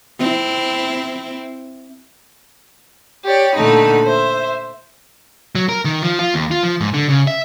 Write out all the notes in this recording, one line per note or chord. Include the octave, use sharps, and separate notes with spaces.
C4 E4
G4 C#5 D5
A#2 D3 A3 D#4 B5
C5 E5
F#3
A#4
D#3
F3
F4
D#2
F4
F3
G#2
D3
C#3
E5